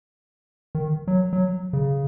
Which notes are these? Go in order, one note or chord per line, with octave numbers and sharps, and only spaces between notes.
D#3
F#3
F#3
C#3